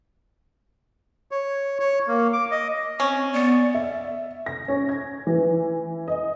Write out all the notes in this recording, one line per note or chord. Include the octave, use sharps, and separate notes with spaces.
C#5
C#5
A#3
D6
D#5
C4 C#4
B3 D5
E5
A#6
C#4
G#6
E3
D#5